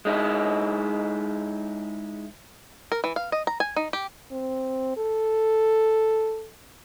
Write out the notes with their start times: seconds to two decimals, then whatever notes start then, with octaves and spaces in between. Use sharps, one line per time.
0.05 G#3 D#4 E4
2.92 A#4
3.04 E3
3.16 F5
3.32 D#5
3.47 A#5
3.60 G#5
3.76 D#4
3.93 G4
4.32 C4
4.97 A4